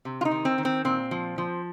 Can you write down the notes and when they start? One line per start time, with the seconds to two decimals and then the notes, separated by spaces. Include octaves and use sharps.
0.05 C3
0.21 F4
0.25 D#4
0.31 D#3
0.45 C4
0.58 D#3
0.65 C4
0.85 A#2 C4
1.11 F3
1.38 F3